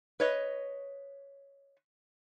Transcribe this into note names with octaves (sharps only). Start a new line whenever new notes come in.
B4 C#5 D#5